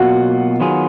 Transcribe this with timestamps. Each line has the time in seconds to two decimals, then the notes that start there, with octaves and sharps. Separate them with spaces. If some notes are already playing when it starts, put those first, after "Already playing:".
Already playing: B2 F#3 A#3 F4 F#4 F#5
0.60 D#3 F#3 B3 F4 G#4